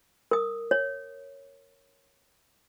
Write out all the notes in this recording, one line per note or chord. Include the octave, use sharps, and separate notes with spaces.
A#4 D#6
C#5